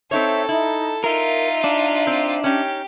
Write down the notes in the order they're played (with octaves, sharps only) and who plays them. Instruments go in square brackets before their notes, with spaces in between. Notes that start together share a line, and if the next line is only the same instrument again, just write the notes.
[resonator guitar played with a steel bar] C4 D#4 C#5 [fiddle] A4 [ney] E5
[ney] D#4 [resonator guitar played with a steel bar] E4
[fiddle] D#4 F4 [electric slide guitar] A#4 [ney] E5
[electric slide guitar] D4
[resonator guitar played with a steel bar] C4
[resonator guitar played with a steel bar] C#4 D#4 [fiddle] G4